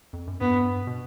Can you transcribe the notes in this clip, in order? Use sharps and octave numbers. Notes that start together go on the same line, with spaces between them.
F2
F#2
G2 B3
B2